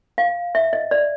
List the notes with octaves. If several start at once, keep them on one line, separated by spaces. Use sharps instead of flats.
F5
E5
D#5
D5